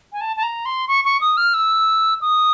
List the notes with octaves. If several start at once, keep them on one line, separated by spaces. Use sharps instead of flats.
G#5
A5
A5
A#5
C6
C#6
C#6
D#6
F6
E6
D#6